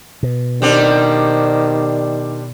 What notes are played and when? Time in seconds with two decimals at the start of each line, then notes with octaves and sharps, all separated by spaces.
0.23 B2
0.62 D#3 G3 C4 D4